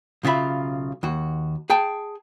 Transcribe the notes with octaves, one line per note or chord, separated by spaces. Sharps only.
B1 C#3 F4 E5 B5
D#2 F#4
G#4 G5 A5